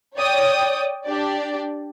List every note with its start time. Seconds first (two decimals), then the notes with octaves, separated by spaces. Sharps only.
0.16 C#5 D5 G5 D#6
1.05 D4 G4 D5